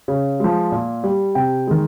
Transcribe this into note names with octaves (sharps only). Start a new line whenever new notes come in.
C#3
F3 G#3
A#2
G3
C3 G5
D#3 G#3